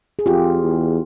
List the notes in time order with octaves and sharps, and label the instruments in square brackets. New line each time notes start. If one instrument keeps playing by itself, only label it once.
[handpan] G#4
[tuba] F2 [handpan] F4 G4
[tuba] E2